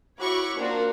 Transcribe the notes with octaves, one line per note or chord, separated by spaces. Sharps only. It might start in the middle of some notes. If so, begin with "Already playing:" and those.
E4 F#4 C#5 B5 C#6 D6
A#3 C4 D4 F4 F#4 A#4